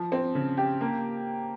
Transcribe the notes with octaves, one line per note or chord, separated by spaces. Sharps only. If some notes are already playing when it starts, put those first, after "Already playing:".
Already playing: F3
C4
C#3
G4
A#3